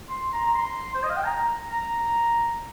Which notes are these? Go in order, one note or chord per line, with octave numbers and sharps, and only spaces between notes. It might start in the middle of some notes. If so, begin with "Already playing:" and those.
C6
A#5
A#5
C6
C5
D#5
F5
G5
A#5
A#5